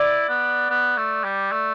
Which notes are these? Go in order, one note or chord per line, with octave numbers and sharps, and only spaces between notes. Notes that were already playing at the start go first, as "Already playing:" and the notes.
Already playing: E4 D5
B3
B3
A3
G3
A3